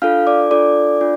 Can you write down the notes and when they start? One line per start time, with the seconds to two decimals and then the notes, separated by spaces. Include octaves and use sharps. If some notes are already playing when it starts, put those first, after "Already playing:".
0.02 D4 F4 A4 F5 F6
0.27 D5 D6
0.51 D4 F4 A4 D5 D6
1.01 D4 F4